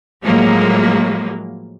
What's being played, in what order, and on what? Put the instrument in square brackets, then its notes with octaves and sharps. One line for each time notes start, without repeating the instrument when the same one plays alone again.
[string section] A2 F3 F#3 G#3 A#3